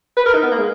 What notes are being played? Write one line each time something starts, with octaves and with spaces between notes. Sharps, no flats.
B4
A#4
D#4
B3
A#3
G#3